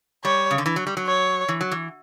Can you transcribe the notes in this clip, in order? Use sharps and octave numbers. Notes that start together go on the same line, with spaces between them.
G3 C#5
C#3
D3
E3
F#3
G3
F#3
C#5
E3
F#3
E3